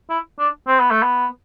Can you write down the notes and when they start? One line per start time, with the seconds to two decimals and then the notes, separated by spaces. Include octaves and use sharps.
0.10 E4
0.39 D4
0.67 C4
0.80 B3
0.91 A3
1.03 B3